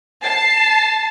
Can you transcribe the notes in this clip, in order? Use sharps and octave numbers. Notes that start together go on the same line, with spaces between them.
A5 C7